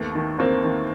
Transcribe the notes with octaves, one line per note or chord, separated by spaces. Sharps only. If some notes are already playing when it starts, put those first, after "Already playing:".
Already playing: D#2 A3 B3
D#3
D#2 A#3 C4
D#3